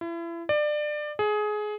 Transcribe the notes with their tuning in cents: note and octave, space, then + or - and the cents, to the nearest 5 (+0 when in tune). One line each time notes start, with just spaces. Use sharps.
E4 +35
D5 +25
G#4 +20